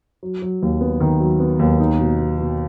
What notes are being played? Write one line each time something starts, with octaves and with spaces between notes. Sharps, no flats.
F#3
F#3
D#2
B3
D#3
F#3
B3
D#2
D#4
B2
B2
B2